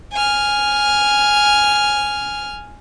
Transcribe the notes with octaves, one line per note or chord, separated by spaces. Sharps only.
G#5 F6